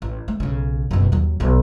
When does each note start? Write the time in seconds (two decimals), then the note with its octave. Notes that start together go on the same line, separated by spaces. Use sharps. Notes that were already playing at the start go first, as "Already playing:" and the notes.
0.02 A1
0.28 A3
0.40 B1 C#3
0.91 F#1 B2
1.12 D#2 F#3
1.40 B1 B3